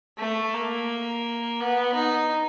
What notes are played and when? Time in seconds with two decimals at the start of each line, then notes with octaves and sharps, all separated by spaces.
0.18 A3
0.53 A#3
1.60 B3
1.94 D#4